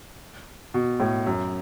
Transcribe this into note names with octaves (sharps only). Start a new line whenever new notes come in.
B2
A2
F#2